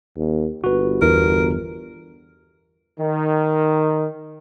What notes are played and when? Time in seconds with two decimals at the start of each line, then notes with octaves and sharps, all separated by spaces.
0.17 D#2
0.64 G1 F#4 B4
1.02 E2 A#4
3.00 D#3